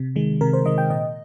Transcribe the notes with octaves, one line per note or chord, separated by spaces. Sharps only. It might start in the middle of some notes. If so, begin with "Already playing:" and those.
Already playing: C3
D#3 G#3
C3 A#4
C5
D#3 G#3 D#5
G5
A#2 D#5